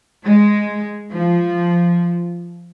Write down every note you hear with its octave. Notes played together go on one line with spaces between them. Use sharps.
G#3
F3